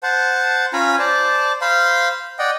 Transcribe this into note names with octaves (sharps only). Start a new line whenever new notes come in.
C5 F#5 A5
C#4 F4 G#5 A#5 B5
C5 D5 A5
C5 F5 B5 C6
D5 D#5 F#5 G5